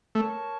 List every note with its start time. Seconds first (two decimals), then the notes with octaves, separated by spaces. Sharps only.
0.15 A3 A#4 C#5 A5 C#6